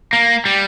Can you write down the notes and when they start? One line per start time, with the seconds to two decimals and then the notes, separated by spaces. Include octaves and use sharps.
0.13 A#3
0.46 G3